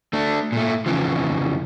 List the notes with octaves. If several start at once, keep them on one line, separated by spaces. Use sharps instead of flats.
A3 D4
A#2 A3
F2 C#3 E3 F3